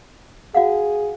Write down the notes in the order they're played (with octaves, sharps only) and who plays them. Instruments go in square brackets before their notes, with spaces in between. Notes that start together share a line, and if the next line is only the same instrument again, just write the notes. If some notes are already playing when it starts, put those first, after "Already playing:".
[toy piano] F#4 F5 F#5 [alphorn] G#4